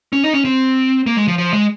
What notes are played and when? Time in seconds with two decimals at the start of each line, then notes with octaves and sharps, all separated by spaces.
0.13 C#4
0.23 D#4
0.33 C#4
0.45 C4
1.06 A#3
1.17 G#3
1.28 F3
1.38 F3
1.53 G#3